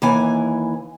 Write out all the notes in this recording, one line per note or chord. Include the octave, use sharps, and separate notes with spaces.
D#2 E3 G#5